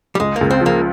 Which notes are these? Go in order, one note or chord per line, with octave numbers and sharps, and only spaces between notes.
G3
C#2 G#3
C#2 A#3
C4
F3 A#3